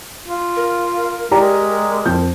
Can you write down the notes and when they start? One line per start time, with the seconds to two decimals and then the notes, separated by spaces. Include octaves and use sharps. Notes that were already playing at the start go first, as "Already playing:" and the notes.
0.27 F4
0.57 A#4
1.31 G#3 G4 D5 A#5
2.06 F2 G6